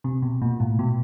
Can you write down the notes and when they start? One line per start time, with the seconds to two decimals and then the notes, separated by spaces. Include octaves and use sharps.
0.04 C3
0.22 B2
0.42 A#2
0.60 A2
0.79 B2